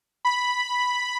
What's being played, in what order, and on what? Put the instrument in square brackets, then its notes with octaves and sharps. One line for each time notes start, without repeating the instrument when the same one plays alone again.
[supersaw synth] B5